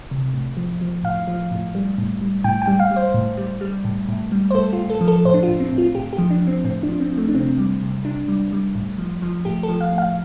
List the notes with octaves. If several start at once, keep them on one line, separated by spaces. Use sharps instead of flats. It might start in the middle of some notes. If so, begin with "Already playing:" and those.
C3
A2
F3
F3
A2 F5
F3
A2
G3
A2
G3
A2 G5
G5
G3
F5
G3
C5
A2
G3
G3
A2
A2
G3
C5
A2 A4
F4
A2
A4
F3
A4
A2 C5
D4
F4
A2
C4
A2
F4
A2 G4
G4
F3
D4
F3
C4
A2 C4
D4
F3
C4
F3
A3
D4
C3 C4
G3
C3
C3 D4
G3
G3
A2
F3
F3
A2 G4
A4
F3
F5
A2
F5